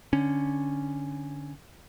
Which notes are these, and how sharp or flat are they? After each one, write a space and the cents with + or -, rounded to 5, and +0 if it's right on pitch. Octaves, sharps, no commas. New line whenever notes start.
D3 +0 C#4 +0